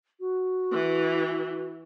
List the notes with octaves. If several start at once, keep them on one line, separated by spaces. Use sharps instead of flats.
F#4
E3